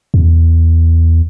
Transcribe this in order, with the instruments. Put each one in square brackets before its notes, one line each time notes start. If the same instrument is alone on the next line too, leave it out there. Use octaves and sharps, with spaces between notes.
[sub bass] E2